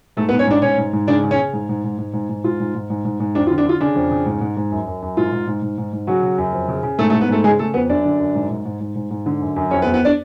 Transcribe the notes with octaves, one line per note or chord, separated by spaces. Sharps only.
G#2 A3 A4
B3 B4
G#2
C#4 C#5
G#2 D4 D5
G#2 C#4 C#5
G#2
G#2
C#3 D4 D5
C#3
C#4 C#5
C#3
G#2
G#2
G#2
G#2
G#2
G#2
G#2 F4
G#2
G#2
G#2
G#2
G#2
F2 D4
F4
D3
D4
D3 F4
C#3 D4
F2
C#3
G#2
G#2
G#2
F#2
F#2
F#2
G#2 F4
G#2
G#2
G#2
G#2
G#2
C#3 F#3 F#4
C#3
F#2
F2
C#3
C#3
G#2 A3 A4
A3 A4
G#2
B3 B4
G#2 A3 A4
C#3 G#3 G#4
C#3 A3 A4
F2 B3 B4
F#2 D4 D5
D3
F#2
G#2
G#2
G#2
G#2
G#2
G#2
D3
F#2
F#2
F2 C#4 C#5
B3 B4
F2
B3 B4
D4 D5